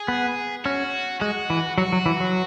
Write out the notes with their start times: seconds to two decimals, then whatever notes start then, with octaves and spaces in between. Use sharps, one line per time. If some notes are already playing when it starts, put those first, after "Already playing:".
Already playing: G#4
0.08 B3
0.65 C#4 F#4
1.21 G#3 F#4
1.50 E3
1.78 F#3 F#4
1.92 F#3
2.06 E3
2.20 F#3